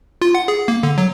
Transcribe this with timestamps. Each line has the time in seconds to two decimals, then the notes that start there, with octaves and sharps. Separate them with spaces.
0.22 F4
0.35 F#5
0.48 G#4
0.68 A#3
0.83 D3
0.98 F#3